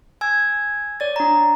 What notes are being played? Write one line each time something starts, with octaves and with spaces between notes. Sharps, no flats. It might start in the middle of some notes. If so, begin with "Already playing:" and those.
G#5 E6 G#6
C#5 D5 A6
D4 A#5